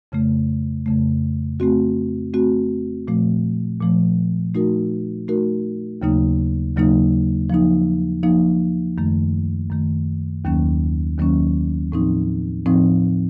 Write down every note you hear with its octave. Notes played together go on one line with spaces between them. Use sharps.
F2 C#3 A3
F2 C#3 A3
A3 C4 F#4
A3 C4 F#4
A#2 F3 A3
A#2 F3 A3
A3 D#4 F#4 A#4
A3 D#4 F#4 A#4
D#2 C#3 F#3 A#3 D#4
D#2 C#3 F#3 A#3 D#4
F3 A#3 D#4
F3 A#3 D#4
F#2 D#3 A3
F#2 D#3 A3
D#2 D#3 F#3 A#3 C#4
D#2 D#3 F#3 A#3 C#4
A2 F3 C4 D#4
A2 F3 C4 D#4